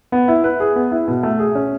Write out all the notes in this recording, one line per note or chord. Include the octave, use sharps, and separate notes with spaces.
B3
E4
B4
G#4
B3
E4
B2
A3
G#4
C#4